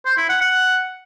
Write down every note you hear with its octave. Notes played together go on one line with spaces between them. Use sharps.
C5
E4
F#5
F#5